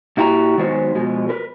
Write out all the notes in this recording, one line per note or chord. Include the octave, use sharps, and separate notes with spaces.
A#2 E4 F#4 G4 A#5
D#3 F#3 G#3 B3 F#4 C5
B2 F3 G#3
A#4 B4